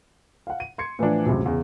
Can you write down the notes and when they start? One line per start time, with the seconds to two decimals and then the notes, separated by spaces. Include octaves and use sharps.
0.47 F5 F#5
0.60 D#7
0.78 C6 G#6 C#7
0.99 A2 E3 F3 D4
1.26 C#2 F#2 A2 C3
1.46 E2 C#3